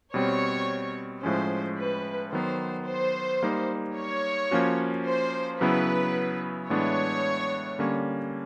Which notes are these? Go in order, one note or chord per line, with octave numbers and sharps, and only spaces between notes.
B2 G3 C4 C#5
A2 F3 G#3 C#4 C5
B4
D#3 F#3 B3 C5
C5
G3 A#3 D#4
C#5
F3 A#3 C#4 F#4
C5
C#3 F#3 B3 E4 B4
A2 E3 G#3 B3 D4 C#5
D3 G3 A#3 C#4